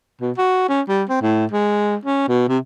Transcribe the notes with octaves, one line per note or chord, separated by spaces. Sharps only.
B2
F#4
C#4
G3
C4
A2
G#3
C#4
B2
C3